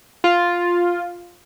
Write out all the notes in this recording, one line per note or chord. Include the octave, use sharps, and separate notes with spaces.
F4